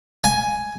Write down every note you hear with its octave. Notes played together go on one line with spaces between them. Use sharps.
G#5